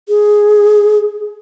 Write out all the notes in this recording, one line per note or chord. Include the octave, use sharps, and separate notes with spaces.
G#4